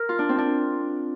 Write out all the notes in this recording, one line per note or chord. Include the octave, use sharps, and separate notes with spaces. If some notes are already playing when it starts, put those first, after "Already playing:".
Already playing: A#4
F4
D4
C4
D4